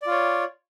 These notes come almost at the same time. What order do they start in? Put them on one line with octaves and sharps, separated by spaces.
D5 F4 C#5